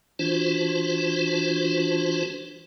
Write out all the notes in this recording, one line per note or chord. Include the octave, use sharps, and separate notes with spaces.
E3 D4 F4 F#4 C5